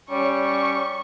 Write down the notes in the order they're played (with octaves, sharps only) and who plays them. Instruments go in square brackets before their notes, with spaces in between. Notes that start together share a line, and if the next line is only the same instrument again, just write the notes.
[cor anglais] G3 [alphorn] C#4 [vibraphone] C#5 D5 [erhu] C#6